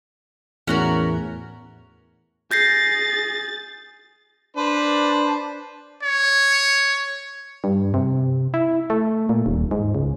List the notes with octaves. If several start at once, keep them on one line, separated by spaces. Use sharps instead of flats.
E2 A2 C#4 F#4 A#4
G#4 G6 A6 A#6 C7
D4 B4 C5
C#5
G2
C3
E4
A3
A#2
D#1
G#2
C#2